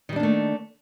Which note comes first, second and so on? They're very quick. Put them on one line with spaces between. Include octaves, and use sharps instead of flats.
D#3 G3 D4 A#3 A3